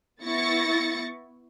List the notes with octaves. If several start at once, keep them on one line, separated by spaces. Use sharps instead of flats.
B3 E4 C#6 A6 A#6 C#7